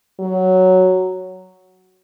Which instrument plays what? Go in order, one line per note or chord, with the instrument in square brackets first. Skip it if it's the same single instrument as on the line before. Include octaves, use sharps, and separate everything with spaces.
[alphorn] F#3